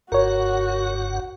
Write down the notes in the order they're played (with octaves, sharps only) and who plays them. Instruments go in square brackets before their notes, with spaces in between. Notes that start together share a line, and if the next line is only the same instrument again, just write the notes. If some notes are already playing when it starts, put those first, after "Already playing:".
[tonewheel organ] F#1 G2 F#5 [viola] F#4 [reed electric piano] A#4 C#5